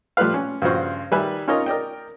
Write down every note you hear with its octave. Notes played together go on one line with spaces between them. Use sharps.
F3 G3 A3 F4 B4 F5
C#4
G2 C#3 F3 F#4 C5 C#6
D#3 G3 B4 E5 G#5 B5
C#4 D#4 F4 A#4 C#5 D#5
A#4 D5 D#5 G5